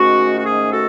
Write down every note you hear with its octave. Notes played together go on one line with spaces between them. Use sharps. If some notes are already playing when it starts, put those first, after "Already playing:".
Already playing: G#2 D#3 A3 C#4 F#4
F#4
G#4
F#4 A4